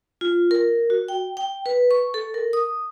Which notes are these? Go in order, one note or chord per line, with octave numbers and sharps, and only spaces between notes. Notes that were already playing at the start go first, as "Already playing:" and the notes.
F4
A#4
F#4
G5
G5
B4
C#6
A4
A#4
D#6